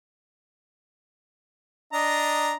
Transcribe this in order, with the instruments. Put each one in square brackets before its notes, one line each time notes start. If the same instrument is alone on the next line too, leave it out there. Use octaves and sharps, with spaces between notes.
[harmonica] D4 D#5 A#5